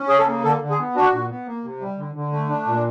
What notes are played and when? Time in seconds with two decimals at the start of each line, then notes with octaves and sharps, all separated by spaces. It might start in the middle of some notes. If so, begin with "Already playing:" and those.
Already playing: C#4
0.08 C#3 G#4
0.19 A4
0.27 A#3
0.44 D3 A4
0.61 D3
0.70 G#4
0.78 B3
0.96 D4 F#4
1.13 A#2
1.30 B3
1.47 A#3
1.64 C3
1.81 G3
1.98 D3
2.15 D3
2.32 A3
2.49 D4
2.66 A#2